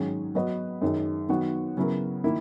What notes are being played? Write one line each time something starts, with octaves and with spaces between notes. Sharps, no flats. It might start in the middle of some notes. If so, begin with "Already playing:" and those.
Already playing: G#2 D#3 F#3 C#4 G#4
F#3 B3 F#4 B4 D#5
F#2 D#3 G#3 D#4
D#3 F#3 B3 F#4
C#3 F#3 B3 E4 A#4
D#3 A#3 E4